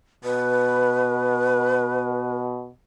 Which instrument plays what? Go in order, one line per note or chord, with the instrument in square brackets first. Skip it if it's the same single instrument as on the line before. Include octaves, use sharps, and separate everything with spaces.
[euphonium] B2 [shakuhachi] B4